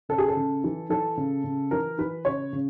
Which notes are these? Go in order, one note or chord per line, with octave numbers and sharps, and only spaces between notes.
C#3 A4
G#4
A4
C#3
E3
E3 A4
C#3
C#3
E3 A#4
E3 B4
C#3 C#5
C#3